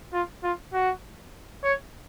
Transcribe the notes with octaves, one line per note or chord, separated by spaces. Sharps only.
F4
F4
F#4
C#5